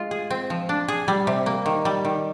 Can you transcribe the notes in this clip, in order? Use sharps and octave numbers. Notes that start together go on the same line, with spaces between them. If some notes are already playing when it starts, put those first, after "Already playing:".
Already playing: G#3 F4
G#4
C4
F3
D4
G#4
G3
C3
A#3
D#3
G3
D#3